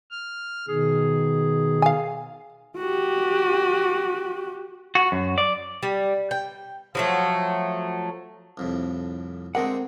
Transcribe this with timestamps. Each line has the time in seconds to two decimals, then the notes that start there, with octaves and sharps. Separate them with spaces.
0.11 F6
0.68 B2 D#3 G#4
1.82 F5 G#5
2.77 F#4 G4
4.95 F#4
5.12 F#2
5.38 D5
5.83 G3
6.31 G5
6.95 F3 F#3 A3
8.57 C2 F2 A2
9.55 D3 G#3 A3 C4 A#4 F#5